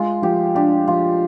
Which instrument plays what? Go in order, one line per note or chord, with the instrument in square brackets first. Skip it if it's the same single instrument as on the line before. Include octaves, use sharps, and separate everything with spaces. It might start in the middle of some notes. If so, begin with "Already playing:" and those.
Already playing: [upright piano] G#3 [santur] F4
[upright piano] F3 [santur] G4
[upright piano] D4 [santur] G4
[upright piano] F3 [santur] F4